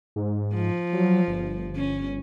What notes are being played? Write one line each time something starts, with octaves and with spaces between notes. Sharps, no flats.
G#2
F3
F#3
G1
C#4